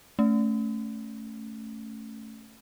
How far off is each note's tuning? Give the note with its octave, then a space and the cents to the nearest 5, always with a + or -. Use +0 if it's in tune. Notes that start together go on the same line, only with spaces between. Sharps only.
A3 +0 C#4 +0